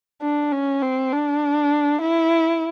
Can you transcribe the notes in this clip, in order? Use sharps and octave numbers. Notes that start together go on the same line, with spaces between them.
D4
C#4
C4
D4
E4